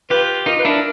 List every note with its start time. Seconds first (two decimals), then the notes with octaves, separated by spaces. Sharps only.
0.10 F4 G4 B4
0.46 D#4 F4 A#4
0.59 B4
0.65 D4 E4
0.70 A#4